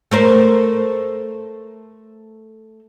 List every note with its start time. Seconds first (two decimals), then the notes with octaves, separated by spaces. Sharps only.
0.11 A3 A#4 C5